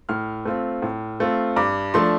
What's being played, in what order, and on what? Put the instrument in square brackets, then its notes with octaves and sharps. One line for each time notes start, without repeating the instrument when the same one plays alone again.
[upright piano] A2 F6
A3 C4 F4
A2
A3 C4 F4
G2 D6
F3 A3 D4 C6